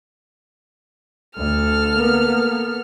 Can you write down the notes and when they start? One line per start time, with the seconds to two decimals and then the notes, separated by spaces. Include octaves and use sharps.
1.36 D2 A4 F6
1.97 A#3 B3